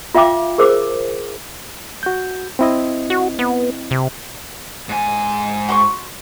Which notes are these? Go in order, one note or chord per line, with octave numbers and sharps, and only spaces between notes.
F4 E5 F5 G5 D6
G#4 A#4 C5 D6
F#4 G6
C4 E4 D#5
F#4
B3
C3
G#2 G#5
F#4 C6 C#6